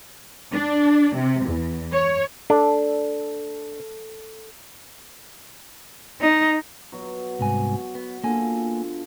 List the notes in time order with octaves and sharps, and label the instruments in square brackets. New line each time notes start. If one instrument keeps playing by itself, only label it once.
[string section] D4
C3
E2
C#5
[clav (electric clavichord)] D4 [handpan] A4
[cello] D#4
[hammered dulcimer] B2 F#3 F#4
[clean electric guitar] C2 G#2 G#5
B3
[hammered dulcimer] D3 F4 [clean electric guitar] A#3 G#5